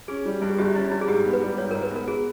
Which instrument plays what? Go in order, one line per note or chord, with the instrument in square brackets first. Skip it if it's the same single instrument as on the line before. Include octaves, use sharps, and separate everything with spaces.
[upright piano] C#4 [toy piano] G#4
[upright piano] G3
G2
[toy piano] G#4
[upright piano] G1 [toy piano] G4
[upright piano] C#4 [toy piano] E4
[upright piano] G3 [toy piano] E4
[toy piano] G#4
[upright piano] G#2 [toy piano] G4
[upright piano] B3
[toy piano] B4
[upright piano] G3
[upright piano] G#2 [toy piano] C#5
[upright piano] G#2 [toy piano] A#4
[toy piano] B4
[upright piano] B3 [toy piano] A#4
[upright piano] B3 [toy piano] G#4